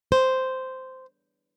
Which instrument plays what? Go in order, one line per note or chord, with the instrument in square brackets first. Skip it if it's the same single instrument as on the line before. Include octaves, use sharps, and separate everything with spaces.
[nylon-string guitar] C5